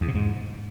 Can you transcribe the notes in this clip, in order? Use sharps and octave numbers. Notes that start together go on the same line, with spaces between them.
E2
C3
G#2